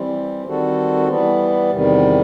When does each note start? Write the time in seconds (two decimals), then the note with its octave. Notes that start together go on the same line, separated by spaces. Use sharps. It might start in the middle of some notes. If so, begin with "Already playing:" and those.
Already playing: E3 G3 C4
0.45 D#3 G3 C4 F#4 A4
1.08 E3 G3 B3
1.70 E2 C3 D#3 G3